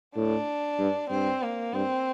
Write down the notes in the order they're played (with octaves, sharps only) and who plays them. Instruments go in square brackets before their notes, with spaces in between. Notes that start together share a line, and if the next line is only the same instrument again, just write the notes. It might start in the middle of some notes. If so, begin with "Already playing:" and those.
[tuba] A2 [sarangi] D4
[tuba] G2
[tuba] G2 [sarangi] C4
[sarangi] A#3
[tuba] G2 [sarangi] C4